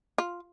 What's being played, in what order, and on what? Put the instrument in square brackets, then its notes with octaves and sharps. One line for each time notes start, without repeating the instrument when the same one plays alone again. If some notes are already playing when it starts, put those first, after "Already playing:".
[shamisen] F4